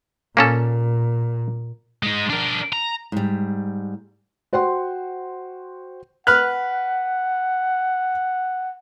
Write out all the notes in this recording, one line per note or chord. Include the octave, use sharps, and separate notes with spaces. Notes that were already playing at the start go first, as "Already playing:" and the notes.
A#2 A#3 C#4 A4
G#3 D#4
D4 A#4
A#5
G#2 G3
F#4 C5 F#5 G5 C6
B4 F#5 F6 F#6